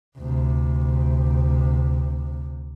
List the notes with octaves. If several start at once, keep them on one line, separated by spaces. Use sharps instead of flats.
D2 C3